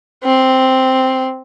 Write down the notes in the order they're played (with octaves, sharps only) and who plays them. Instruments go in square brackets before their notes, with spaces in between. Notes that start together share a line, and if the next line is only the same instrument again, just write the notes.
[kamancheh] C4